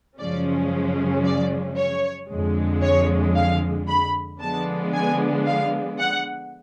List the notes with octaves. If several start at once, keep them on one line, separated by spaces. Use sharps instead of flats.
F#2 C#3 F3 G#3 C#4 D5
D5
C#5
F2 D3 F3 G#3
C#5
F5
B5
D3 F3 G#3 B3 D4 A5
G#5
F5
F#5